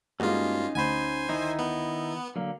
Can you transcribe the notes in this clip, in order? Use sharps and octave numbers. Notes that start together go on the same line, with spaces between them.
G2 G#3 A#3 C#4 D#4 F4 F#4
D2 C5 F#5 G#5 B5
D#3 D#4 E4
B3
D3 F#3 A#3